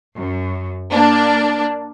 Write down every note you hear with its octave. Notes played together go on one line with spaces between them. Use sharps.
F#2
A#3 D4